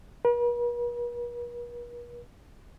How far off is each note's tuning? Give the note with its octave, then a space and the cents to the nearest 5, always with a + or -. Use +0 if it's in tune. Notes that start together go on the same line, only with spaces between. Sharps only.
B4 -45